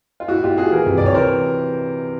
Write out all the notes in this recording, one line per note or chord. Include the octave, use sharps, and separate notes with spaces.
F4
A#2 E4 F#4
A#2 F4 G4
A#2 F#4 G#4
E3 G#4 A#4
C3
C3 D5
C#5
E3 A#4 C5